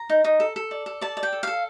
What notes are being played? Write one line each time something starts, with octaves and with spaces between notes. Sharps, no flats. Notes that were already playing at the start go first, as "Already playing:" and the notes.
Already playing: A#5
D#4
D#4
A4
A4
D5
A4
D5 A5
D5
G5
A4
A4 F5